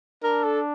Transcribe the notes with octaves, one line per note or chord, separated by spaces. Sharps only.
D4 A#4
A4